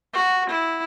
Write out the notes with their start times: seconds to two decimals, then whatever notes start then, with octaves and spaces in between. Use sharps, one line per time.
0.13 F#4
0.49 E4